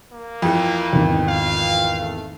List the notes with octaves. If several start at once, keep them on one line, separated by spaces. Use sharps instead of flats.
A#3
F2 E3
G#1 E2
F5
A3